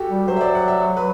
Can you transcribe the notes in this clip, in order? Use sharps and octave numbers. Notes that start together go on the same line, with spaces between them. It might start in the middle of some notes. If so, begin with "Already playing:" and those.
Already playing: F#4 G4 A4
G3
F#3 C5
E5
D5
F#5
E5
B4